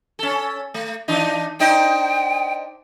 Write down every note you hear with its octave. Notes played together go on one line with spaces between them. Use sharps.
C#4 A4
A3
E3 D4 D#4
D4 D#4 C5 G5